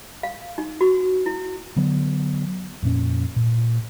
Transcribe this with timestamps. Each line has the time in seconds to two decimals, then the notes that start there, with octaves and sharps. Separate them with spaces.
0.23 F5
0.58 D#4
0.81 F#4
1.26 E4
1.76 D3 F#3 B3
2.82 F2 A#2 C#4
3.36 A#2